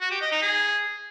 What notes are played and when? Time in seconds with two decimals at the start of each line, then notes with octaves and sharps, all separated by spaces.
0.01 F#4
0.11 G4
0.21 D#5
0.32 D#4
0.42 G#4